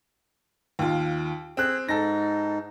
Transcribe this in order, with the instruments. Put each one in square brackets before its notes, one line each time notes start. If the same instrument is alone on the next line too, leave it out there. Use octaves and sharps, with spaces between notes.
[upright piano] D#2 F4
[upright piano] C4 F#6 [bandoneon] G#4
[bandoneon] G#2 D#4 [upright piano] A4 A#6